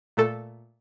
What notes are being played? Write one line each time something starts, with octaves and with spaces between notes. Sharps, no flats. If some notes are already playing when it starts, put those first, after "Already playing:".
A#2 A3 A4